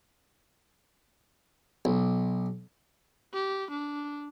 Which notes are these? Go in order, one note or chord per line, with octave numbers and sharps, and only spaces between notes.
B1
G4
D4